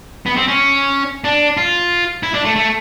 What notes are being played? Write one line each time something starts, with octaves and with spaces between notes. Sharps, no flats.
B3
C4
C#4
D4
F4
E4
D4
A3
A3